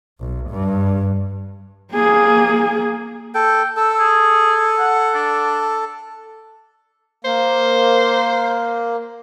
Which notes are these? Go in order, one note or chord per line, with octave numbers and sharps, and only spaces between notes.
B1
G2
A#3 G#4
A4 G5
A4 E6
G#4
F#5
D4
A#3 C5